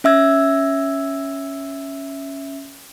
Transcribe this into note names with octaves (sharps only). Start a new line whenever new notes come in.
C#4 E5 E6 G#6